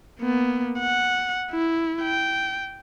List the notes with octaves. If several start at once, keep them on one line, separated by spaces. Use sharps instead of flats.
A#3 B3
F#5
E4
G5